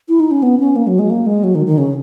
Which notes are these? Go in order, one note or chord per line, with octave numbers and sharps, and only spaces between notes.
E4
D#4
C#4
B3
C#4
A#3
F#3
G#3
A#3
G#3
F#3
D#3
D#3
C#3